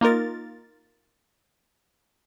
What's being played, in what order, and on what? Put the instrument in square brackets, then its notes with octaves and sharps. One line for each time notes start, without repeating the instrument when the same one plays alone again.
[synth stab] A#3 D#4 F4 A#4 A6